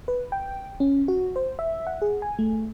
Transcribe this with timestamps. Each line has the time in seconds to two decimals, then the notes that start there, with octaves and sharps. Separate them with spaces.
0.08 B4
0.32 G5
0.80 C#4
1.08 F#4
1.36 C5
1.59 E5
1.87 F#5
2.02 G#4
2.22 G#5
2.39 A3